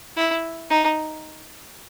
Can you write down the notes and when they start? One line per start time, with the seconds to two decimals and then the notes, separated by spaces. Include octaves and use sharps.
0.16 E4
0.70 D#4